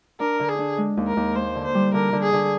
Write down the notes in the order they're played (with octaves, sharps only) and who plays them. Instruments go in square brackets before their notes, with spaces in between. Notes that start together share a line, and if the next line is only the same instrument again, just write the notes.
[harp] D4 [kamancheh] A#4
[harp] D3
[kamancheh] G#4
[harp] D4
G#3
D#2
[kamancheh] A#4
[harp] D#2
[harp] A#3 [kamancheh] C5
[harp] D3
[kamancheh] C5
[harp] G3
[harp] D3 [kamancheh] A#4
[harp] D3
[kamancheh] G#4
[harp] D3